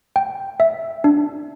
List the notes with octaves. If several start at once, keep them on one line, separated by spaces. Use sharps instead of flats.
G5
E5
D4